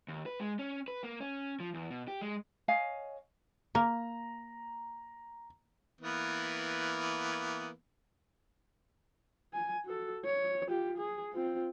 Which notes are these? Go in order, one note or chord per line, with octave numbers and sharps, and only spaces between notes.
D#2
B4
G#3
C#4
B4
A#3
C#4
F3
E2
B2
G4
G#3
C#5 D#5 F5 G#5
A#3 A#5
E3 A#3 B3
G#5
F#4 A4
C#5
F4 G4
G#4
C4 F4